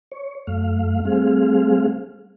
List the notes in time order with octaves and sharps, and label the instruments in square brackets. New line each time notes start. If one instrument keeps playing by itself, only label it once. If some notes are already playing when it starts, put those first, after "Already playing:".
[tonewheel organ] C#5
F#2 A3 F5
G3 A3 C4 G#4 F5